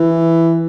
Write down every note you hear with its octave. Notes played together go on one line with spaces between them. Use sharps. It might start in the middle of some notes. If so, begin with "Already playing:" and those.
Already playing: E3